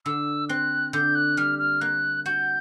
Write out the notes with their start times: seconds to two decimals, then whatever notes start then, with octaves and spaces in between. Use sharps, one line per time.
0.05 D3 E6
0.49 C4 F#6
0.93 D3 G6
1.15 F#6
1.37 G3 F6
1.59 F6
1.81 A#3 F#6
2.26 F#4 G6